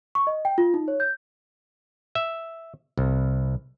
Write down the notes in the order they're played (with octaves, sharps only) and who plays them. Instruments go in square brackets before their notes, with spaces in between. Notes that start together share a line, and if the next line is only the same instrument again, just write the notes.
[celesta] C#6
D#5
G5
F4
D#4
C#5
G6
[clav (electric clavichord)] E5
C2